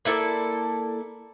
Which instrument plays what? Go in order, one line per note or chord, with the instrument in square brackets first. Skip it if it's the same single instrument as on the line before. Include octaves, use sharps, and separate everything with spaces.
[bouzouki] A#3 E4 A4 D5